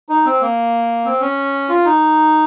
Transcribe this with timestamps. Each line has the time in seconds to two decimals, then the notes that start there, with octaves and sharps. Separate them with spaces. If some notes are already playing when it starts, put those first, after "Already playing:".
0.09 D#4
0.25 C4
0.41 A#3
1.05 C4
1.21 C#4
1.69 F4
1.85 D#4